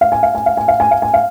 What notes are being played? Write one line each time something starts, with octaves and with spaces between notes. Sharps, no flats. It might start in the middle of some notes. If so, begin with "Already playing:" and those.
F5
G#5
F5
G#5
F5
G#5
F5
G#5
F5
G#5
F5